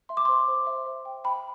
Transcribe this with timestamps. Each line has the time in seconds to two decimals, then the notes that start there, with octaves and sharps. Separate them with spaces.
0.09 E5 C6
0.17 D6
0.25 C5 C6
0.48 C5
0.67 E5
0.86 C5
1.05 G5
1.24 G5 B5